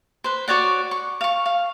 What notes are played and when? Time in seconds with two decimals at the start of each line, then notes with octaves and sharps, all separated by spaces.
0.24 B4 C5
0.48 F#4 C#5 D5 F#5
0.91 C#6
1.21 F5 C#6
1.46 F5